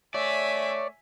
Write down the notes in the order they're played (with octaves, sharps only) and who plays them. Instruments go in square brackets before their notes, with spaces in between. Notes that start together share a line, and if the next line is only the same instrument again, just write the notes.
[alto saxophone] A3 [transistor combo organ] C#5 [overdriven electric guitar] D5 [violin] E5 G#5